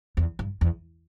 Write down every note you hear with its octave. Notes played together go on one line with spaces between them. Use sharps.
E2
G2
E2